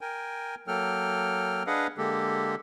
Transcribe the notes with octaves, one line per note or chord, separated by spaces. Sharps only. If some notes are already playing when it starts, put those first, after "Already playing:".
A#4 G5 G#5
F#3 A#3 A4 G5 F6
D4 G#4 B4 D#5 F5 F#5
D3 G#3 A#3 G4 A4